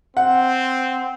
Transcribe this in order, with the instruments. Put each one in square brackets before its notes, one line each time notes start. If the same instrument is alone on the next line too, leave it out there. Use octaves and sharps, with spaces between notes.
[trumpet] C4 [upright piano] F#5